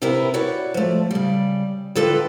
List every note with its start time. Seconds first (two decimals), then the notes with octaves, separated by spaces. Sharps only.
0.02 C3 E4 G4 A#4 B4
0.34 F#4 C#5 D5
0.74 F3 A3
1.11 C#3 G3
1.95 D3 F4 A4 B4 G5